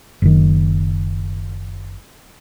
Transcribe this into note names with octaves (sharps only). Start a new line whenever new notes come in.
F#1 D#3